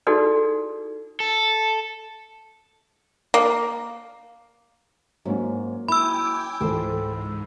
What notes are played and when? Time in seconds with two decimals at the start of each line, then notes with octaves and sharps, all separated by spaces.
0.07 D#4 E4 F#4 G#4 A4 D5
1.20 A4
3.34 A#3
5.25 G#2 F#3 A#3 C#4
5.88 E4 G5 G#5 B5 D6 E6
6.61 C#2 G#2 E3 A4 C5 G5